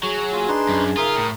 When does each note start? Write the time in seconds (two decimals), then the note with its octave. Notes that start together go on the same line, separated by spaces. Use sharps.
0.04 F#3 G#4
0.33 A#3 F4 G#5
0.48 D4 D#4 B4 C6
0.69 F#2
0.97 C#3 D#4 F4 A#4 E5 D#6
1.16 A2